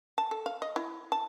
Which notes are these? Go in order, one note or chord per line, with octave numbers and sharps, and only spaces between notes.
A5
A4
F5
D#5
E4
A5